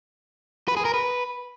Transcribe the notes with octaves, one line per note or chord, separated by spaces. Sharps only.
B4
G#4
A#4
B4